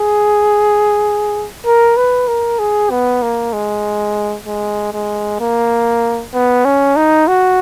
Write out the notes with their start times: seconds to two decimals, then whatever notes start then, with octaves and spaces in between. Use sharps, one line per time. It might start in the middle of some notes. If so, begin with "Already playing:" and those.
Already playing: G#4
1.66 A#4
1.97 B4
2.28 A#4
2.59 G#4
2.91 B3
3.22 A#3
3.53 G#3
4.46 G#3
4.93 G#3
5.40 A#3
6.34 B3
6.65 C#4
6.96 D#4
7.28 F#4